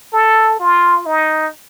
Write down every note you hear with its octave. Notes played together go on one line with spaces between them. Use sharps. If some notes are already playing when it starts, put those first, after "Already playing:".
A4
F4
D#4